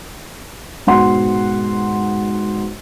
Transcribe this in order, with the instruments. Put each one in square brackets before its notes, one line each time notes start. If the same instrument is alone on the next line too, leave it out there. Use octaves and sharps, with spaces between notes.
[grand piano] G#2 B2 F#5 C6